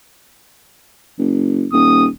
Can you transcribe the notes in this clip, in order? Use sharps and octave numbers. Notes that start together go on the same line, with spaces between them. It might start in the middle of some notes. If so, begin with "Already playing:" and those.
F#1
D#1 D#6